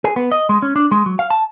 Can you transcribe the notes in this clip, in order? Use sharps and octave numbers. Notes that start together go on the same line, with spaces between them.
G#4
B3
D#5
G#3
C#4
D4
G#3
F#3
F5
A5